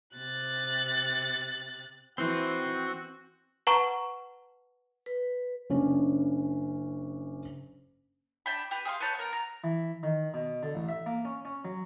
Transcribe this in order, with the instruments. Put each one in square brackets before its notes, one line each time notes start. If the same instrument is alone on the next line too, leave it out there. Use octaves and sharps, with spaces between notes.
[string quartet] C3 F#6 A6
[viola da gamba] E3 [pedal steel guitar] C4 [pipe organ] F#4
[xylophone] B4 F#5 A5 A#5 C#6
[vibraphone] B4
[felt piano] F#1 C#4 D4
[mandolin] D4 G5 B5
G4 B4
G#4 F5 C6
B4 C#5 A5 G6
B3 A#4
A#5
[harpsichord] E3
D#3
B2
D3
A1
E5
A#3
C#4
C#4
F#3